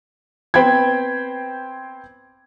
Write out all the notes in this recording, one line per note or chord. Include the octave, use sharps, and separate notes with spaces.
B3 C4 C5 G5 B5 G#6